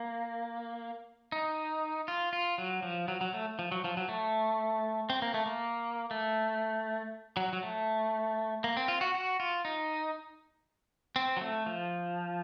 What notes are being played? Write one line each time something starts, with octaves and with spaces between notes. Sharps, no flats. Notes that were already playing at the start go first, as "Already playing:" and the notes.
Already playing: A#3
D#4
F4
F4
F#3
F3
F#3
F#3
A3
F3
F#3
F3
F#3
A3
C4
A#3
A3
A#3
A3
F#3
F#3
A3
A#3
C4
F4
F#4
F#4
F4
D#4
C4
F#3
A3
F3